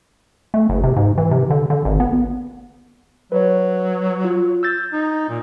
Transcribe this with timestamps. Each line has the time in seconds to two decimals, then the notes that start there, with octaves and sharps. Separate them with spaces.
0.54 A3
0.69 F#1
0.84 C3
0.97 G#2
1.18 E3
1.31 C3
1.50 D3
1.70 D3
1.85 G#1
2.00 B3
3.32 F#3 B4 C#5
4.24 F4
4.63 E6 G6 A6
4.92 D#4
5.29 A#2